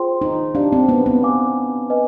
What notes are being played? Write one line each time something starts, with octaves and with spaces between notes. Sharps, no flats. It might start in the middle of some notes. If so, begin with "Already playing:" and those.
Already playing: F4 G#4 C5 G5 C6
D#4
D4 G4 D5 F5
C4
B3
B3
B4 F5 G#5 D6
B4 D#5 G#5